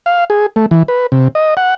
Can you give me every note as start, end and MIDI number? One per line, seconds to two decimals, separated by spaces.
0.06 0.24 77
0.30 0.46 68
0.56 0.66 57
0.71 0.83 52
0.88 1.07 71
1.12 1.28 48
1.35 1.54 75
1.57 1.74 78